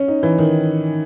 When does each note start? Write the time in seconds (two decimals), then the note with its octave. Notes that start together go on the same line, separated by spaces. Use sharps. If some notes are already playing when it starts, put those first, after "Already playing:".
Already playing: C#4
0.08 D#4
0.23 E3
0.38 D#3